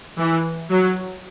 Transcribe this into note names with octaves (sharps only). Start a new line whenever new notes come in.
E3
F#3